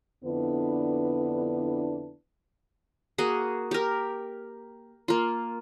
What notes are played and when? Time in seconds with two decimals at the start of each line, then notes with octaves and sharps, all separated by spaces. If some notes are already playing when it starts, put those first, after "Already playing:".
0.24 F2 D3 B3 D4 E4 B4
3.18 A#3 F#4 G#4
3.71 G4 A#4
5.08 A#3 F4